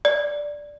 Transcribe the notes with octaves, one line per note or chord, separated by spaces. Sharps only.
D5